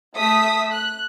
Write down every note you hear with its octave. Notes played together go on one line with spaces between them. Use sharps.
A3 E5 D#6 B6
F#6